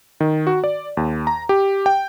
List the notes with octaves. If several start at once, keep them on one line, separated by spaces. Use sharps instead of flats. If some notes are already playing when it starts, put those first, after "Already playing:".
D#3
F#4
D5
D#2
A#5
G4
G5